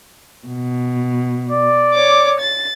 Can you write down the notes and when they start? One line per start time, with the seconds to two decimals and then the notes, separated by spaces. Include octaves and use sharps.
0.46 B2
1.50 D5
1.92 C#5 D6
2.38 A6